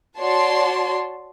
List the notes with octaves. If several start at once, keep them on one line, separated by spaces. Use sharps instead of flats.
F#4 C#5 D5 A5 C6